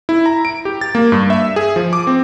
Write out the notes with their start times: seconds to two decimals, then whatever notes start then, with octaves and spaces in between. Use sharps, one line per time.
0.09 E4
0.26 A#5
0.45 D7
0.65 G4
0.81 A6
0.95 A#3
1.12 G2
1.30 E5
1.56 G#4
1.76 F3
1.93 D6
2.07 C4